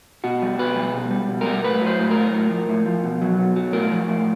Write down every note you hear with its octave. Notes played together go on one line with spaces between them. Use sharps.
B2 F#4
G3
B2 B4
G3
B2
G3
B2
G3 A#4
A2 B4
F#3
C5
A2
A#4
F#3
A2
F3
A2
F3
B2
F#3
B2
F#3
A2 A#4
F3
A2